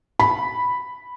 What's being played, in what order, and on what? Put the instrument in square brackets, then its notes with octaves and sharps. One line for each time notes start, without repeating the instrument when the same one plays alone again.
[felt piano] B5